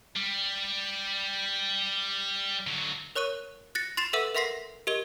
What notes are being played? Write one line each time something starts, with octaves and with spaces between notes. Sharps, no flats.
G3
D3 F#3
A#4 C#5 C#6 F#6 D#7
F#6 A6 A#6 C#7
C6 A6 C7 E7 F7
A4 B4 E5 F#5 E6 D#7
A#4 E5 F#5 C6 A#6 C7
G4 A#4 D#5 G7